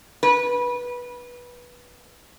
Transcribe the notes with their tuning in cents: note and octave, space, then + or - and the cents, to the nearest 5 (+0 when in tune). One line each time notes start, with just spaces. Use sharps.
B4 -15